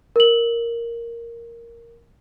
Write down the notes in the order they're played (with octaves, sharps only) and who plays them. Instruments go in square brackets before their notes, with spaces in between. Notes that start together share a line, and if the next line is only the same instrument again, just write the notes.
[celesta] A#4 F#7